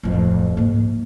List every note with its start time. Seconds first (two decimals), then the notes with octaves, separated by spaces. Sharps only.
0.03 D1 F2
0.57 G#2 A#3